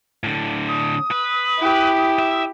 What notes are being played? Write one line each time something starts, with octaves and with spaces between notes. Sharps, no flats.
A2 D3
D#6
B4
E4 G4
E5